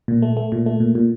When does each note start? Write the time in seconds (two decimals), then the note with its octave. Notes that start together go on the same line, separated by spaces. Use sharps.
0.08 A#2
0.22 A3
0.37 A3
0.52 A#2
0.66 A3
0.80 A#2
0.95 A#2